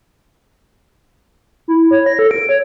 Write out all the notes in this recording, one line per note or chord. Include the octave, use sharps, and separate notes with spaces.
E4
C#5
A#6
A4
D7
C#5